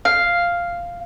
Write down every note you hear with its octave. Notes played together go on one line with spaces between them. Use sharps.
F5